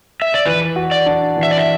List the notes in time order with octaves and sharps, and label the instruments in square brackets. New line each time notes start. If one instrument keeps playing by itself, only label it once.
[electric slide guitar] E5
D5
[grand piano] E3 [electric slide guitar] B4
[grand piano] F#4
[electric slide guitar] D5
[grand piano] D4
E3
[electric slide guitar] E5
D5
E5